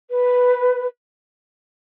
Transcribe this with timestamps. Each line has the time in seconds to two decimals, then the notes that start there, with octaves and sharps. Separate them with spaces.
0.10 B4